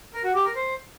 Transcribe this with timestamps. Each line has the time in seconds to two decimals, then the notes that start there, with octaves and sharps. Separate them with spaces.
0.13 A#4
0.24 F#4
0.34 G4
0.45 A#4
0.55 C5